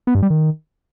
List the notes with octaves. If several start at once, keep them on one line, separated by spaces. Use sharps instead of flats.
B3
G2
G3
D#3